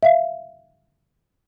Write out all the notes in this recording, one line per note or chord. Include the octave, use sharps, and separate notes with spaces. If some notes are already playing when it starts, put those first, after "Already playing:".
E5 F5